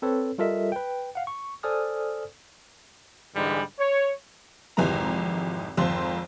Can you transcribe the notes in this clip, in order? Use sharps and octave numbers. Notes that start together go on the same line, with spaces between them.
C4 A4 B4 C#5
G3 F4 A4 A#4 D#5 E5
B4 G5
F5 F#5
C#6
A4 C5 D5 G#5 D#6 F6
G#2 D3 E3 G3 G#3 B5
C#5
G#1 F2 C3 E3 G#3 A#5
G#1 F2 F3 C5